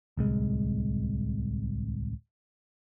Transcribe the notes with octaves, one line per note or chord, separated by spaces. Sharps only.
D1 C2 G#3